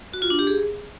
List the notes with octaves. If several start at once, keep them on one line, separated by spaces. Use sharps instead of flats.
F#4
F4
D4
G4
G#4